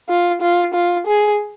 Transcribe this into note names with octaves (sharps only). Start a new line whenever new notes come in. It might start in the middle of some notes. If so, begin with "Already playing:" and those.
F4
F4
F4
G#4